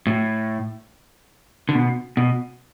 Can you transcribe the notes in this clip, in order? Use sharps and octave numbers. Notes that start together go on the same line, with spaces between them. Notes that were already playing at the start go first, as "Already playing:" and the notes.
A2
D3
B2
B2